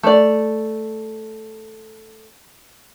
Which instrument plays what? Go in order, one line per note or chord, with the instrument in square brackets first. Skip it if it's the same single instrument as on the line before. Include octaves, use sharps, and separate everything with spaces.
[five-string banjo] A3 D5